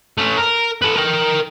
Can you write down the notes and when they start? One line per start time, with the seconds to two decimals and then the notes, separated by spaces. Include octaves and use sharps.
0.18 A3 C#4
0.37 A#4
0.82 A4 B4
0.96 A#4 G5